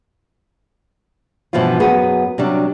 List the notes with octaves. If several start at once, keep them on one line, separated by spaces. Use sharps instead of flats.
G2 B2 E3 F3 E4 F4
F#2 B3 F#4 G#4
C3 F#3 G3 D4